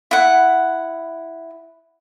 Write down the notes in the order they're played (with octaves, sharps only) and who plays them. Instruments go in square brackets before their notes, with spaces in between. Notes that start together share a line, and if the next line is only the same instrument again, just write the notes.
[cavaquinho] E4 F#5